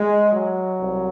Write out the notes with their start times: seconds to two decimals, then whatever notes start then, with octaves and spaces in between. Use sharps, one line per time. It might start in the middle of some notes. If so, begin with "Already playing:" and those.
Already playing: G#3
0.33 F#3
0.79 C2